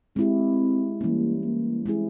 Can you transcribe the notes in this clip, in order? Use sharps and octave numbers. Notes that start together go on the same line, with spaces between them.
G#3 C4 E4 G4
E3 G3 A#3 C#4
A#3
G#3 C4 E4 G#4